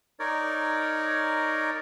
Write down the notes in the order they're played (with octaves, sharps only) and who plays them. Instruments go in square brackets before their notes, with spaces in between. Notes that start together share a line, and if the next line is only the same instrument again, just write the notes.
[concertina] D#4 A#4 C#5 D5